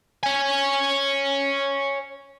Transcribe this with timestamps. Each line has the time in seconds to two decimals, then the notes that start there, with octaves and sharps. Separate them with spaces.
0.23 C#5 G#5